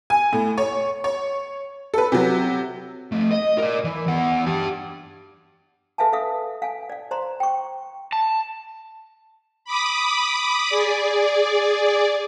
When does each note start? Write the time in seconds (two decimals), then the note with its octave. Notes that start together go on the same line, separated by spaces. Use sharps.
0.10 G#5
0.33 A2
0.58 C#5
1.04 C#5
1.94 A4 B4
2.12 C3 F#3
3.12 F3 A3
3.31 D#5
3.58 A#4 D5
3.84 E3
4.07 E2 F#5
4.46 G4 A5
5.98 A4 B4 E5 F5 G#5 A5
6.12 A4 B4 E5 F5 D#6
6.62 F5 G#5
6.90 D5 F5
7.11 C5 D5 A#5 C6
7.40 G5 C#6
8.12 A5
9.65 B5 D6 D#6
10.69 G#4 D5